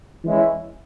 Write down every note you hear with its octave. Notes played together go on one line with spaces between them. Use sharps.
E3 G#3 C#4 E4